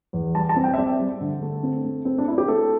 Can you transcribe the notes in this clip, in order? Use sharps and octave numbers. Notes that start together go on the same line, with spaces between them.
E2
G3 A5
A5
C4
G5
E5
C4 D5
G3
D3
A3
C4
A3
C4
D4
C4 E4
G4
A3 A4